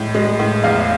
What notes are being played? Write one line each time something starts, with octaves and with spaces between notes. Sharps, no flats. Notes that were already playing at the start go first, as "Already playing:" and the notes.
Already playing: A2 G#3
G#3
A2
E2 F5